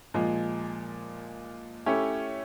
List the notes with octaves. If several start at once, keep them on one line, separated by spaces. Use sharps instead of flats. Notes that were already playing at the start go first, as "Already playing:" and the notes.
A#2 F3 G#3
A3 C#4 E4 G4